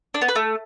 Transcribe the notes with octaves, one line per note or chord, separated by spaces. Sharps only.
D4
B3
B4
A3